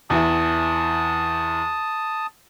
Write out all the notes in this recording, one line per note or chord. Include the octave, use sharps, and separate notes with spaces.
E2 E3 E4 A5 D#6